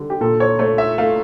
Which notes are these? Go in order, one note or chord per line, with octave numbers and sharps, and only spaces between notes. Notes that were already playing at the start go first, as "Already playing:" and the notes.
Already playing: D3 G3
G4
A#2 A4
C#5
A3 C#5
E5
A3 F5